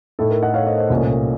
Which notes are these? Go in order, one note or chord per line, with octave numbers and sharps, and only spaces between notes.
A2 A3 D#4 A4
A#4
D#5 F#5
C#5 F5
C5 D#5
C5 D#5
C2 A#2 A3 C#4